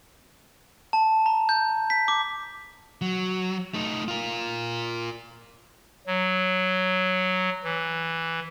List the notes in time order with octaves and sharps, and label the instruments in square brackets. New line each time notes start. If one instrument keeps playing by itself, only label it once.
[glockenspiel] A5
A#5
G6
B6
D6
[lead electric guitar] F#3
A3 D#4
F4 A#4
[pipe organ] F#3
E3